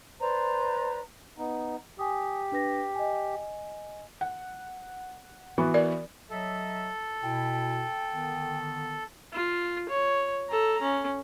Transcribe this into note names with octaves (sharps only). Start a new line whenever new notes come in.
B4 C5 D5 A#5
B3 D#4
G4 G#5 D#6
D4 B4 A#6
D#5 G#5
F#5
E3 B3 F#4
A#4 D5
F#3 A4 D#5 E5
B2 E4 G5
D3 D#3 B3
F4
C#5
A4 A#5
C#4